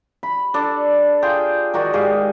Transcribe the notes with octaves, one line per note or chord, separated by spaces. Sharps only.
B5
D4 A4 D5
F4 G#4 G5
D#3 D#4 F#4 D5
G#2 G4 G#4 F5